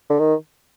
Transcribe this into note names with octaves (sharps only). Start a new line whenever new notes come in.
D3
D#3